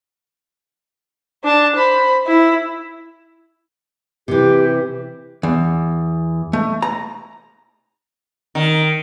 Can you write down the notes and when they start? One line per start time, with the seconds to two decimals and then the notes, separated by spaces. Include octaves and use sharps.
1.44 D4 A5
1.76 C5 B5
2.26 E4
4.28 C3 E3 G4
5.43 E2
6.53 A3
6.82 A#5
8.55 D#3